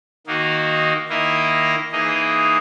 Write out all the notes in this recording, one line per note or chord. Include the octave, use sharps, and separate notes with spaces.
D#3 A#3 D#4 F#4
D#3 A#3 E4 A#4 D#5
E3 A#3 D#4 G#4 D#5